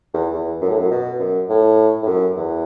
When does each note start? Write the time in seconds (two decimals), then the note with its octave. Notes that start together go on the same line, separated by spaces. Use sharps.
0.14 E2
0.33 E2
0.61 F#2
0.69 A2
0.78 F#2
0.91 B2
1.19 F#2
1.49 A2
2.02 A2
2.07 F#2
2.37 E2